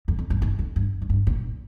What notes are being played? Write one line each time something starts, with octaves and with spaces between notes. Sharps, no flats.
F2
F2
G2
G#2
F2
G2
G#2
G2
A#2